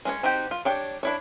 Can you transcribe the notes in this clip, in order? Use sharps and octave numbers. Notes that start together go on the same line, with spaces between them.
G#3 C#4 B4 C#5
C4 D#4 F#4 G4
F4
D4 G4 C#5
D4 E4 C#5